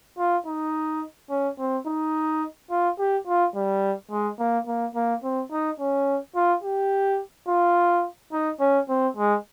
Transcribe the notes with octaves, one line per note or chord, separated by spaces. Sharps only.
F4
D#4
C#4
C4
D#4
F4
G4
F4
G3
G#3
A#3
A#3
A#3
C4
D#4
C#4
F4
G4
F4
D#4
C#4
C4
G#3